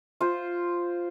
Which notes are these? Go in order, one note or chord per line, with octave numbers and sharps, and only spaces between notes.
F4 C5